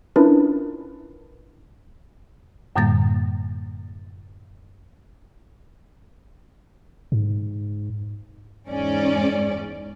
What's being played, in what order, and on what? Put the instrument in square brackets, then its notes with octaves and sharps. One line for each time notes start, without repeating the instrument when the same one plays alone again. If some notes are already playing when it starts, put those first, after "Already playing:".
[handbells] C#4 D4 E4 F4 A#4 B4
[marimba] F#2 A2 D3 G3 A#3 A6
[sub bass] G#2
[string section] E2 G#2 C#4 D5